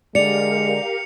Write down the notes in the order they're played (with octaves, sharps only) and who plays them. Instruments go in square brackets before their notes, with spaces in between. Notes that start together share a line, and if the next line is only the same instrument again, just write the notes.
[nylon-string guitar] D3 D5 [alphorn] G#3 [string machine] G4 A#4 F5 [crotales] C#7 F7